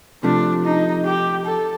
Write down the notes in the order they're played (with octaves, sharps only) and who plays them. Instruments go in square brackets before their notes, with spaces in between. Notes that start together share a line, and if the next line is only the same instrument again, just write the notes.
[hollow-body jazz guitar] C3 F3 A3 [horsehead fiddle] D4
[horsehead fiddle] D#4
G4
A4